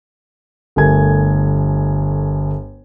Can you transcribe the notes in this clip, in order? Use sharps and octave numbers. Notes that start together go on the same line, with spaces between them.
G1 A3 G4 A#4 G#5 G#6